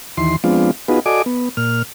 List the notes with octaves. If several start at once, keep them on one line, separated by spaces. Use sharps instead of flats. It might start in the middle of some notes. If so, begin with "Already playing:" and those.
D#2 E3 C6
F3 G#3 B3 C4 D4 F4
B3 D#4 F4 F#4 G#4 B4
F#4 A4 D5 D#5 G#5 D6
B3
A#2 F6